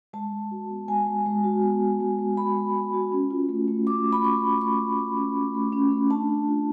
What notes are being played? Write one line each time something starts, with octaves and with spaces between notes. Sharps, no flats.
G#3 A5
G#3
F#4
B3
G#3 G#5
G#3
G#3
F#4
B3
G#3
G#3
G#3
B3 B5
G#3
G#3
F#4
C#4
F4
A3
A3
A3 D6
A3
B5
F4 C#6
F4
A3 C#6
A3
A3
C#4
A3
A3
C#4
A3
D4 A5
D4
F4